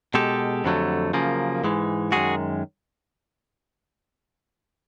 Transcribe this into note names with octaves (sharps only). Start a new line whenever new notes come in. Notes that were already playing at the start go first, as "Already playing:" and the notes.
B2 G#3 G4 A4
F2 D3 F#3 A3
F#2 C#3 F3 A#3
G#2 E3 G#3
F#2 D#3 G#3 F#4 G#4